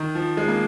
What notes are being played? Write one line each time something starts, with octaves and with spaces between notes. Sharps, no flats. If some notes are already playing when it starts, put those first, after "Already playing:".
Already playing: D#3
F3
G#3
A#3